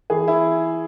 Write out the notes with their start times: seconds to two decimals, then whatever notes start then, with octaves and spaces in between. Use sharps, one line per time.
0.10 E3 G#4
0.28 E4